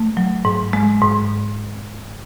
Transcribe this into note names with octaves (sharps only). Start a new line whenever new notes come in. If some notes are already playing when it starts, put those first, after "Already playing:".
Already playing: A3
F#3
G#2
G#3
G#2